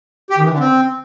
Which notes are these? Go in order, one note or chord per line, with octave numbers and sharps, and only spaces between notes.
G4
D#3
E3
D3
C4